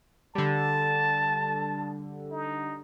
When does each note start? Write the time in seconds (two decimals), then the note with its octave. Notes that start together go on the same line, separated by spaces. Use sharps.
0.35 D3 G3 A5
2.31 D#4